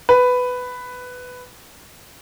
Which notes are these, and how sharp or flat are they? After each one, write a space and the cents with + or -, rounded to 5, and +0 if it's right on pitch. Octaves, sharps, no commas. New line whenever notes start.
B4 +10